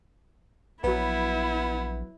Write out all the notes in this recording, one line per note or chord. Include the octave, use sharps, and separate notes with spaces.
A#1 F#3 B3 E4 B4